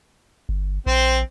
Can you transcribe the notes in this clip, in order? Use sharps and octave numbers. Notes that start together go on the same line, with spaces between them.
G1
A#1 C4 C5